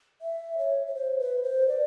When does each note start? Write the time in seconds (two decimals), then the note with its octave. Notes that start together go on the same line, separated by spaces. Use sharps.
0.22 E5
0.58 C#5
0.87 C#5
0.95 C5
1.19 B4
1.43 C5
1.68 D5